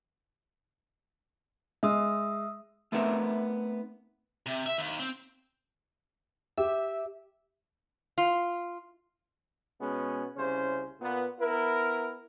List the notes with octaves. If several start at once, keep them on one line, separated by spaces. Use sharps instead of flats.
G#3 E5 D#6 E6
A3 B3 C4 D#4 A#4 E5
C3
E5
D#2
C4
G4 E5
F4
B2 G#3 B3 C#4
C2 C#3 C#4 C5
A#2 B3
B3 E4 A#4